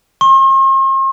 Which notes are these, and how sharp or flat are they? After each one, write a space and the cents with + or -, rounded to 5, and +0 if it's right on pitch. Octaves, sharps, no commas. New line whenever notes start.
C6 +45